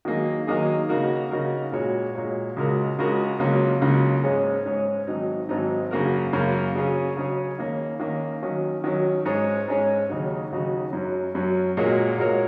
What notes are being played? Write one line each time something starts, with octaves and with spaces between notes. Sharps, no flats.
D#3 F#3 A#3 D#4 G#4
D#3 F#3 A#3 D#4 G#4
C#3 A#3 D#4 F#4 A#4
C#3 A#3 D#4 F#4 A#4
A#2 G#3 F#4 C#5
A#2 G#3 F#4 C#5
C#2 C#3 G#3 F#4 A#4
C#2 C#3 G#3 F#4 A#4
C#2 C#3 F#3 A#3 C#4
C#2 C#3 F#3 A#3 C#4
G#2 G#3 C#4 G#4 C#5
G#2 G#3 C#4 G#4 C#5
G#1 G#2 F#3 D#4
G#1 G#2 F#3 D#4
F#2 C#3 A#3 F#4 A#4
F#2 C#3 A#3 F#4 A#4
C#3 F#3 C#4 G#4 C#5
C#3 F#3 C#4 G#4 C#5
D#3 A#3 C#4
D#3 A#3 C#4
D#3 F#3 C#4
D#3 F#3 C#4
G#2 G#3 C#4 G#4 C#5
G#2 G#3 C#4 G#4 C#5
D#2 C#3 F#3 D#4 F#4
D#2 C#3 F#3 D#4 F#4
F#2 F#3 C#4
F#2 F#3 C#4
A#2 G#3 F#4 A#4 C#5
A#2 G#3 F#4 A#4 C#5